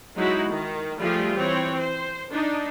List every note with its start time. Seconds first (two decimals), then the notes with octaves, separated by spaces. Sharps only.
0.15 F#3 G#3 D#4 E4 F#4
0.48 D#3
0.99 F3 G3 A3 F4 G4 G#4
1.36 E3 C4 C#5
1.79 C5
2.32 D4 D#4